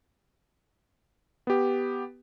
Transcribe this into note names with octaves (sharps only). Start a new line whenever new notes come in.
B3 G4